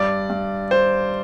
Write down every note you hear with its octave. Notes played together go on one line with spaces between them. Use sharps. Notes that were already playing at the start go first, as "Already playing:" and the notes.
Already playing: G2 D5
G2
C5